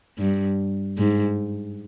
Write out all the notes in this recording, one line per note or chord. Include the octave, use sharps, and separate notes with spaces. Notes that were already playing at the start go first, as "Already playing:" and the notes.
G2
G#2